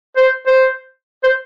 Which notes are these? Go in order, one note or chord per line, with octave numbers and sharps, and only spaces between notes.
C5
C5
C5